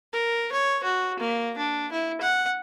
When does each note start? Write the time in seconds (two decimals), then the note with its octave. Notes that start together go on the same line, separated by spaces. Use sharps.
0.13 A#4
0.52 C#5
0.84 F#4
1.19 A#3
1.57 D4
1.92 E4
2.21 F#5